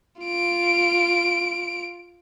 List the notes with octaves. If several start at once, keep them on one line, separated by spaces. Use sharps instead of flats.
F4 D7